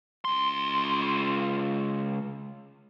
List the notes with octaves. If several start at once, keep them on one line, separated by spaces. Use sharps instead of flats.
C#2 C6